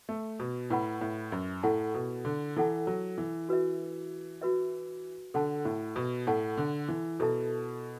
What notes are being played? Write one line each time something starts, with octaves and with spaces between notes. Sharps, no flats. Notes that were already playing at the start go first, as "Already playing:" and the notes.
A3
B2
A2 E4 B4 F#5 B5
A2
F#2
A2 E4 A4 F#5 A5
B2
D3
E3 E4 A4 F#5 A5
F#3
E3
F#4 B4 E5
F#4 B4 E5
D3 A4 F#5 A5
A2
B2
A2 A4 F#5 A5
D3
E3
B2 E4 A4 E5 A5